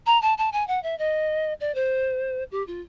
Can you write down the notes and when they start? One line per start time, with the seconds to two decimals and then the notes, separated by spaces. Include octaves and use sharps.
0.06 A#5
0.21 A5
0.37 A5
0.52 G#5
0.67 F#5
0.83 E5
0.98 D#5
1.60 D5
1.74 C5
2.51 G4
2.67 F4